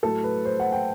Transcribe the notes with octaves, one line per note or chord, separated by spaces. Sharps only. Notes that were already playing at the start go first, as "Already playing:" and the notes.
A2 F#3 A4
B4
C5
F#5
G5